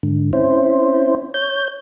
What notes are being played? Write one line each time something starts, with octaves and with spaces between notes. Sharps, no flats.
G#2 D3
C4 C#4 E4 C5
C#5 G6